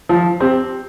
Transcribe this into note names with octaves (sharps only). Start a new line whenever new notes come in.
F3
C4 G4